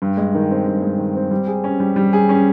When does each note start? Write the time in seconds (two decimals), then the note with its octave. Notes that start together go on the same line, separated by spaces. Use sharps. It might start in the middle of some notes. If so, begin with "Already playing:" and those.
0.02 G2
0.17 G#3
0.34 D#3
0.50 C4
0.67 G2
0.82 G#3
0.98 D#3
1.15 C4
1.31 G3
1.47 G#4
1.64 C#4
1.80 G3
1.96 G3
2.13 G#4
2.29 C#4